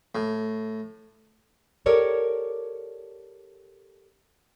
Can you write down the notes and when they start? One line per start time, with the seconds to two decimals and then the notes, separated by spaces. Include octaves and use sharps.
0.15 A2
1.86 G4 A4 A#4 C#5 D5